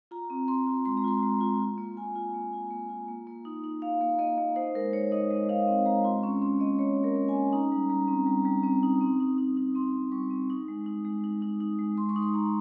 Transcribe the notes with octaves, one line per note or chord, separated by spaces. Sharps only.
F4 A#5
C4
C4 C6
F4
G#3 C6
A#5
F4 C6
G#3
F4
F4
A#3
F4 G#5
F4
A#3
F4
A#3
F4
A#3
A#3
D#4
D#4
A#3 F5
A#3
A#3 D#5
A#3
D#4 C5
G#3 A#4
D#4 C#5
D#4 D#5
G#3 D#5
D#4 F5
C4
G#3 A#5
F4 C6
C#4 C#6
C#4 C6
A#3 D#5
A#3 C#5
A#3
A#4
A#3
G#5
C#4
D#4 A#5
G3
G3 A#5
C4
G3
G3
C4
D#4
C4
D#4
D#4
D#4
C4 C6
C4
G3 C#6
C4
D#4
G#3
D#4
G#3
D#4
D#4
D#4
G#3
G#3 C6
C#6
D#4
C6
D#4 A#5